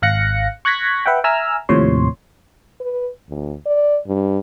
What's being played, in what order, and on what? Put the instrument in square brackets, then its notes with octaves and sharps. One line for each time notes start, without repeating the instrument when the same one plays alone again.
[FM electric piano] G#1 F5 F#6 A#6 C#7
C#6 F#6 G#6 A#6 B6
B4 E5 F#5 G5
E5 G#5 A#5 E6 F6
D#2 A2 C3 F3 C#5 C6
[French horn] B4
D2
D5
G2